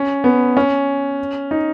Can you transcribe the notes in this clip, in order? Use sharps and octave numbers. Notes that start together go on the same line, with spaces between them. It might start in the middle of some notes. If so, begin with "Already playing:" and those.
Already playing: C#4
B3
C#4
D#4